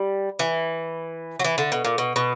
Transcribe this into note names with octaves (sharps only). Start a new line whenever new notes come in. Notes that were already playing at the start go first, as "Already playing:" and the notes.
Already playing: G3
E3
F#3
E3
D3
B2
A#2
B2
B2